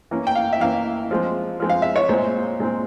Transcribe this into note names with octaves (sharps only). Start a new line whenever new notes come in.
E3 A#3 C#4
G5
F5
E5
E3 A#3 C#4 F5
F3 G#3 C4
F3 G#3 C4
F5
E5
C#5
A#2 G#3 C4 C5
A#2 G#3 C4